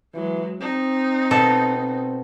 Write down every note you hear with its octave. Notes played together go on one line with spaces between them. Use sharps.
E3 F#3 G#3
C4 D#4
B2 A4
C4